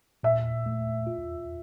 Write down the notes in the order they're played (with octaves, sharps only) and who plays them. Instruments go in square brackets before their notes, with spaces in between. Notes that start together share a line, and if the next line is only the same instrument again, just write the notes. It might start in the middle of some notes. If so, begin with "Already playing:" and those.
[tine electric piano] A#2 [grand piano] E5
[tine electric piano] A3
F4